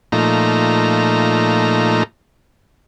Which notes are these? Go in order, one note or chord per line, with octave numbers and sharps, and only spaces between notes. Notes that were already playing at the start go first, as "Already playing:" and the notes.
A#2 F3 A3 D#4 A#5